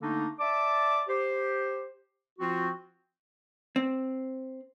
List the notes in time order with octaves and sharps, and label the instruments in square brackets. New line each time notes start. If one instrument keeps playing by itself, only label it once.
[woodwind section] D3 A3 A#3 D4 D#4
D5 E5 A5 D6
G4 C5
F3 C4 F4 F#4
[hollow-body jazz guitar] C4